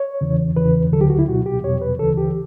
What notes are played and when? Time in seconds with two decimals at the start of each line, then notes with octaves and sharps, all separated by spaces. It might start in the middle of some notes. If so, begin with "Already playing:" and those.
Already playing: C#5
0.21 E2 C#3 E3
0.56 E2 C#3 E3 B4
0.92 D2 D3 F#3 A4
1.01 G4
1.10 F#4
1.19 E4
1.28 C#2 B2 F#3 F#4
1.46 G4
1.63 E2 B2 F#3 C#5
1.81 B4
1.99 D2 C#3 E3 A4
2.17 G4